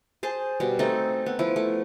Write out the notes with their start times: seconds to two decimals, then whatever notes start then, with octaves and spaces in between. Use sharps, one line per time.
0.23 G#4 C5 A5
0.60 B2 G3
0.79 A3 C4 D#4 A4
1.26 B3
1.39 F3 E4
1.56 A3